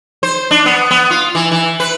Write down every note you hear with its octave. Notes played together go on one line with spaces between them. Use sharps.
C5
D4
B3
B3
F4
E3
E3
B4